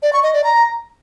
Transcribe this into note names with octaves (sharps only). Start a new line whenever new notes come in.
D5
C#6
D#5
D5
A#5